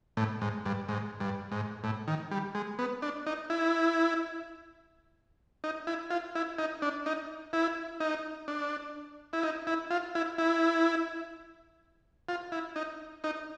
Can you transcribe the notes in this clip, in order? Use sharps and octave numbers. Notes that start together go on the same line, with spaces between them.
A2
G#2
G2
G#2
G2
G#2
A2
D#3
G3
G#3
B3
D4
D#4
E4
D#4
E4
F4
E4
D#4
D4
D#4
E4
D#4
D4
E4
D#4
E4
F4
E4
E4
F4
E4
D#4
D#4